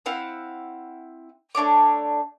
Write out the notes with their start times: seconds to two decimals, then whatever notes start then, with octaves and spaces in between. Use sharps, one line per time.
0.06 C4 E4 F5 F#5
1.55 A3 D4 C#5 D6